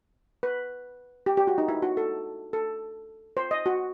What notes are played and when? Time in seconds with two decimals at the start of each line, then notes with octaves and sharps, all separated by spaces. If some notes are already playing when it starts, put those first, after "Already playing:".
0.43 B4
1.26 G4
1.37 G4
1.47 F#4
1.58 D#4
1.68 E4
1.82 F#4
1.97 A4
2.53 A4
3.37 C5
3.51 D#5
3.66 F#4